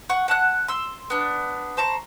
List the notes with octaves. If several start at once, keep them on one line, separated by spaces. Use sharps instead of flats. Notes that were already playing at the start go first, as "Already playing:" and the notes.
F#5 C#6
F#5 A5 F#6
C6 E6
B3 D4
C5 A5 A#5 C#6